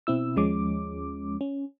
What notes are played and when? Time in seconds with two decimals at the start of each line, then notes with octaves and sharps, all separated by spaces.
0.07 B2 C4 E4 E6
0.36 D#2 F3 G#3 C#4 D6
1.41 C#4